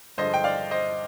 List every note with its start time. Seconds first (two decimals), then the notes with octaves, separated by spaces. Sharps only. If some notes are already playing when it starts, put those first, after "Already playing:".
0.18 G2 D3 F3 G#3 C5 D#5
0.34 G5
0.44 D5 F5
0.71 C5 D#5